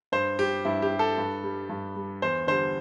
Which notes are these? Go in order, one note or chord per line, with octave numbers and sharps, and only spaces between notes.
G2 C5
G3 G4
G2 E4
G4
G3
A4
G2
G3
G2
G3
E2 C5
D3 G3 C5